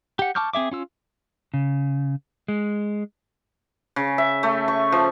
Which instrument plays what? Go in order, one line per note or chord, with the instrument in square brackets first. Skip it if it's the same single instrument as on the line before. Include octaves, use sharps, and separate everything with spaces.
[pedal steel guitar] G4 F#5
A5 C#6 D6 F6 G6
C4 G#4 E5 D6
C#4 F4 E6
[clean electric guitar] C#3
G#3
[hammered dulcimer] C#3
E5
A3
C#6
F3